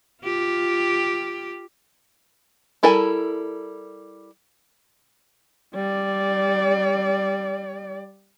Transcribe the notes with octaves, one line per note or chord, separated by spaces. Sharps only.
F4 G4
G3 E4 A4 A#4 G#5
G3 D5